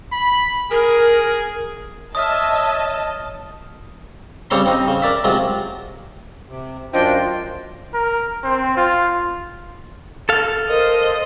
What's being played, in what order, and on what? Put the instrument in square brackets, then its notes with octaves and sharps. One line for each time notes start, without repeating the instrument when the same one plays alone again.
[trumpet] B5
[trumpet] G#4 [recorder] A#4
[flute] C#5 [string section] D#5 A5 [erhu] E5 [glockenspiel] D#6 F6
[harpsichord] C#3 G3 C4 C#5 A#5 C6
C4 D#4
C#3
A#4 D5 E5
C3 F#3 G#3 F4
[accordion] C3
[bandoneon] F#2 F4 [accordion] D4 G5 [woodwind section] C5 [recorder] D#5
[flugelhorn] A#4
C4
F4
[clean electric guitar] A4 F5
[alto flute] A#4 [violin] C5 D#5